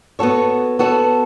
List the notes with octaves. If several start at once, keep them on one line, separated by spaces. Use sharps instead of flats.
B3 F#4 A4 C#5
B3 F#4 A4 C#5